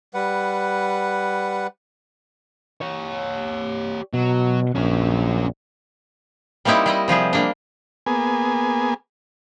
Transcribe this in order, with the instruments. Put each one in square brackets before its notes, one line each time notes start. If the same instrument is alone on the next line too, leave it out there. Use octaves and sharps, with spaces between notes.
[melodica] G3 B4 F#5
[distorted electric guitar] G4 C#5
[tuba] B2 [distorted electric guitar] F#3
[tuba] A#1 [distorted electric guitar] C#4 A#4
[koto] G3 A#3 C4 D#4 E4 G4
G3 E4 D#5
C3 F3 G3 G#4
G3 A#3 D4
[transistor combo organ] A#3 B3 G#4 G#5